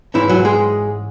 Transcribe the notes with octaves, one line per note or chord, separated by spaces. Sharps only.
G#2 E3 C#4 E4
F#3 F#4
G#3 G#4